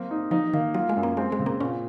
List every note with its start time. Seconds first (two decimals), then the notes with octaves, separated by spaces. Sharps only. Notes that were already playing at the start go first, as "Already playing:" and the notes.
Already playing: F#3 A#3 C4
0.11 D#4
0.31 F3 D#4
0.54 D#3 A#3
0.74 F#3 F4
0.89 G#3
0.97 F#2
1.03 A#3
1.17 G#3 C4
1.32 G#3
1.39 C#3
1.46 A#3
1.60 A#2 C#4